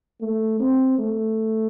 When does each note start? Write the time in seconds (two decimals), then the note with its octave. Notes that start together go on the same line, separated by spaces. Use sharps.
0.21 A3
0.60 C4
0.98 A3